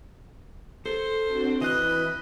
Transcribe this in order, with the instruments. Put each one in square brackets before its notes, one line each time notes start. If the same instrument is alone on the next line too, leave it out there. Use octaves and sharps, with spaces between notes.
[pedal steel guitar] A4 [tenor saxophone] C5
[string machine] C4 D4 F#4
[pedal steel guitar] E3 F#6 [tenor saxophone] D#5 [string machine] B5